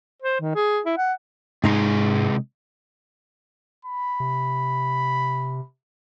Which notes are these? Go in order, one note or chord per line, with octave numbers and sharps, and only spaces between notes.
C5
D#3
G#4
E4
F#5
G#2 C3 G#3 D#4 G#4 C6
B5
C3